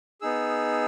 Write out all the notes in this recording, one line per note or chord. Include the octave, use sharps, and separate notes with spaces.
B3 D#4 G#4 E6